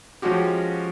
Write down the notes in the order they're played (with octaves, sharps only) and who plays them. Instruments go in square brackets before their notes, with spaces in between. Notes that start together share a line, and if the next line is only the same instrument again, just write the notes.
[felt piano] F3 G#3 C#4 F#4 G4